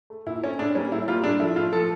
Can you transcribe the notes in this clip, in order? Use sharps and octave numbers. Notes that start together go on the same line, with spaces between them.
A3
A#2 E4
A3 C#4
A2 D4
G3 A#3 C#4
A2 E4
G3 A#3 F4
A2 D4
F3 A3 E4
A2 F4
F3 A3 A4